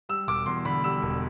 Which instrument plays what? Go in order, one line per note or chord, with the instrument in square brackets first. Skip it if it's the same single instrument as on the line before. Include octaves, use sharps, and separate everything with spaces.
[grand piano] G3 E6
E1 D6
E2 C6
D3 B5
G3 E6
E1